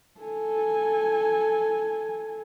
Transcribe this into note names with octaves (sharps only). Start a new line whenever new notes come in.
A4 G#5